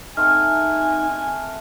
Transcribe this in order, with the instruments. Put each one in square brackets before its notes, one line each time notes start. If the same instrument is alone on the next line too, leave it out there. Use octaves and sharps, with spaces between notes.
[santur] A3 C4 F#5 [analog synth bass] D#4 [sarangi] G#5 [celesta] F6